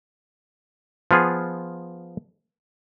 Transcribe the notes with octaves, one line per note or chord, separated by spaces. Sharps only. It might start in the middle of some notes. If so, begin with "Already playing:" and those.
F3 B3 F4 G#4